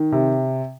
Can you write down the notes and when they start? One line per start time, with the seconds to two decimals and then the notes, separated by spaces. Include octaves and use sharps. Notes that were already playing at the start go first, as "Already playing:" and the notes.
Already playing: D#3
0.12 C3